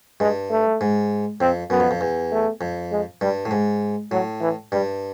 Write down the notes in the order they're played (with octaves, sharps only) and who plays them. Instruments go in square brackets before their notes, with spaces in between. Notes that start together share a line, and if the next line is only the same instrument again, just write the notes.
[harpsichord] G2 [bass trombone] G#3
[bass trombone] A3
[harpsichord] G#2
[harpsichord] F2 [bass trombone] C4
[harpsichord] F#2 [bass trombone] B3
[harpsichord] F2
F2
E2
[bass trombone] A3
[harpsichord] F2
[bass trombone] G#3
[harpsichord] G2 [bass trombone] G3
[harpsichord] A2
G#2
[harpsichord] A2 [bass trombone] F#3
[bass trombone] E3
[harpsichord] G2 [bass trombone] G3